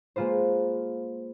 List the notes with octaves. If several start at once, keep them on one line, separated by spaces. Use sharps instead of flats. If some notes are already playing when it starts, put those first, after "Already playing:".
G#3 A#3 F4 B4 C5